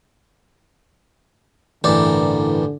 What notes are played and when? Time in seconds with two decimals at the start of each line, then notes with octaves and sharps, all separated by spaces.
1.84 A1 G2 D3 E3 A#4 D5